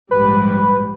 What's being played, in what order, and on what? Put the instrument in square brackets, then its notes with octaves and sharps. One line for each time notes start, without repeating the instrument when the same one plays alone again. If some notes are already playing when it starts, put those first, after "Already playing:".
[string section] A#1 G#2 G3 [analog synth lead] B4